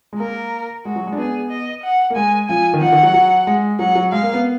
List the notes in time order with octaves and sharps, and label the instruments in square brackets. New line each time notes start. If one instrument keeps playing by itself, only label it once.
[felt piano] G#3
[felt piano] A#3 [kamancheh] A#4
[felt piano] G#3 [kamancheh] F#4
[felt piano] F#3
G#3
D4
[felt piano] B3 [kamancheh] G#4
[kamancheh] D#5
F#5
[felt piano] A#3
[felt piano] G#3 [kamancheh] G#5
[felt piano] F3 [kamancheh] G#5
[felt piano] D#3
[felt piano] F3 [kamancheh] F#5
[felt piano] D#3
F#3
F#3
G#3
[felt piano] F#3 [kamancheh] F#5
[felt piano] F#3
[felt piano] G#3 [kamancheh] F5
[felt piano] A#3
B3